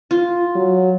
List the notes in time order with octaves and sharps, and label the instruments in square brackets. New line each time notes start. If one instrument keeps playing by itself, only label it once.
[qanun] F4
[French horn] F#3